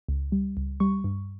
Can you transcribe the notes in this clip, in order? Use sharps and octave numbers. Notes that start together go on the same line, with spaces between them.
C#2
G3
C#2
G3 C#6
G2